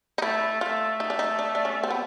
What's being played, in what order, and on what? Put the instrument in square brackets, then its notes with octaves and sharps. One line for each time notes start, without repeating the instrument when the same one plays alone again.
[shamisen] D#4
[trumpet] A3 [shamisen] E4
[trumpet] A3 [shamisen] F4
[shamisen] D#4
D4
D#4
D4
D4
C#4
C4
B3